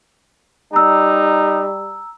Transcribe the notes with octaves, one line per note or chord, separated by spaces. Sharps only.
G3 D#4 A#5 E6